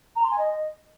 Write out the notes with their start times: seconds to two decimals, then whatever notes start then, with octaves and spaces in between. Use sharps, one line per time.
0.16 A#5
0.23 C6
0.31 G#5
0.38 D#5